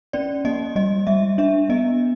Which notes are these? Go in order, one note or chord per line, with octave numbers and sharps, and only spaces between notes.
C#4 D5
A#3 D#5
G3 D#5
G3 E5
D4 E5
B3 D#5